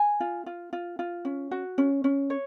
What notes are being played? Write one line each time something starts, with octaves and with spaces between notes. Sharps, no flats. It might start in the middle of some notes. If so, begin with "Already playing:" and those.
Already playing: G#5
F4
F4
F4
F4
C#4
F#4
C#4
C#4
C#5